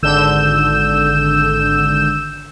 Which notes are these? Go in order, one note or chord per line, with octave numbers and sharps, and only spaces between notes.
G#1 D3 E6 G6 E7